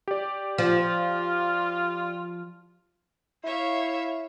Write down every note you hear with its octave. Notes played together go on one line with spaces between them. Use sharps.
G4 D5
F3 F4
E4 C#5 E5 F5